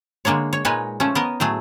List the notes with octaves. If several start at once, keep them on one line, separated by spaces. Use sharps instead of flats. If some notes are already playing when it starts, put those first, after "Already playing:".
D3 G#3 A#3 D4 C#5
C#5
A#2 G#3 D#4 B4 C#5 G#5
F3 A3 C#4
B3 A#4 D#5
A2 F#3 A3 G#4